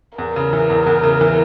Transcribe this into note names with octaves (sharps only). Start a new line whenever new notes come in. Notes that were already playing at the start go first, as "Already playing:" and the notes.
E2 A#4
C#3
E3
E2
E2
C#3
E3